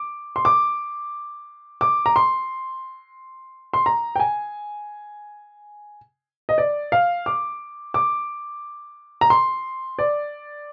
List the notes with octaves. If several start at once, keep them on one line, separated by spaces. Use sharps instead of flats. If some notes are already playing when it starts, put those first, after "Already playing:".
Already playing: D6
C6
D6
D6
A#5
C6
C6
A#5
G5
G#5
D#5
D5
F5
D6
D6
A#5
C6
D5